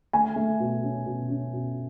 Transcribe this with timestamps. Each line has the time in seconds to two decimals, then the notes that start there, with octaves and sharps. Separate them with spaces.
0.13 A3 G#5
0.36 A3
0.60 B2
0.83 C#4
1.06 B2
1.30 C#4
1.53 B2